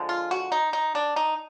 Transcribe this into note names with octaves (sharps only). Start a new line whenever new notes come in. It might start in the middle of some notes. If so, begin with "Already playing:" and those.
Already playing: D3 F3 G#3
F4
F#4
D#4
D#4
D4
D#4